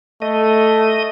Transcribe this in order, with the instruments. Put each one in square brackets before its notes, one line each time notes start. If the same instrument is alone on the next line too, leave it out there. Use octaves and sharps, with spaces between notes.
[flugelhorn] A3 [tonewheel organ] D#5